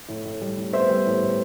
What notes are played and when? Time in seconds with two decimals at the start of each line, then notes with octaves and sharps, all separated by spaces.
0.08 A2
0.25 A2
0.41 G3
0.57 A2
0.73 B3 C5 E5
0.90 G3
1.06 A2
1.22 A2